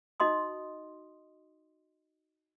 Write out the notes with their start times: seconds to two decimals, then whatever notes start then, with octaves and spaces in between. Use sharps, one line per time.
0.20 D#4 F#4 D#5 C6 D#6